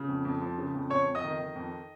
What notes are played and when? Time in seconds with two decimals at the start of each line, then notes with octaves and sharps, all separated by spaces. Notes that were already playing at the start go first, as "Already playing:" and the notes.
Already playing: C#3
0.09 F2
0.25 F2
0.41 F3
0.58 C#3
0.75 F2
0.90 F2 C#5 C#6
1.07 F2
1.15 D#5 D#6
1.24 D#3
1.39 D#3
1.56 F2